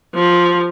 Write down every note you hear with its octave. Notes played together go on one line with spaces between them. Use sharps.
F3